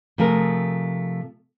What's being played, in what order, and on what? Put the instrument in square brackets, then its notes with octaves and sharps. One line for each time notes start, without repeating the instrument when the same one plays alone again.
[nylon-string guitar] C3 F3 A3 G#4 A#4